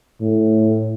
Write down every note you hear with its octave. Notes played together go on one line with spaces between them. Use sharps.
A2